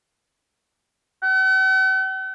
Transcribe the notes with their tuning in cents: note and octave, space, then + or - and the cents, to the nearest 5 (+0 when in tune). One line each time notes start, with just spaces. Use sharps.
F#5 +45